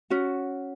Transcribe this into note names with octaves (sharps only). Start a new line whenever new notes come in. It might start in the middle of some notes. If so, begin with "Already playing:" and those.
C#4 F#4